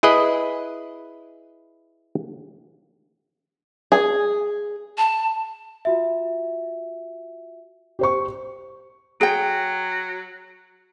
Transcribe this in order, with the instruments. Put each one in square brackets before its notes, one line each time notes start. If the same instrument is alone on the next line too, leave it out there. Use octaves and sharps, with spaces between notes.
[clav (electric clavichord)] E4 G#4 B4 D#5
[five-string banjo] G#4
[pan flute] A5
[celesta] F4 F#4 E5
[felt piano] G4 C5 C#6
[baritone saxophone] F#3 [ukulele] G#4 G5